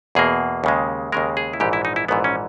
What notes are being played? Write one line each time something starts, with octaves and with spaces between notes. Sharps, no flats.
E2 B2 A#3 G#4
D#2 C#3 G#3
D#2 C#3 G#3 A#4
G#4
E4
A#1 G#2 E3 G4
E4
D#4
E4
A#1 G#2 E3 B3
C#4